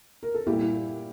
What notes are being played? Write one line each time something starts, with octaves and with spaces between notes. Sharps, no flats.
A#4
A4
A#2 G3 E4 G4